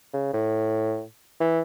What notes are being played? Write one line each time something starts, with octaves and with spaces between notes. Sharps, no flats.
C#3
A2
E3